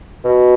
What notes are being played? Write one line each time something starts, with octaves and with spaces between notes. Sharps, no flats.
B2